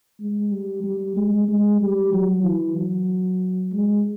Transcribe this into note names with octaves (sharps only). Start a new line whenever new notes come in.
G#3
G3
G3
G#3
G#3
G3
F#3
E3
F#3
G#3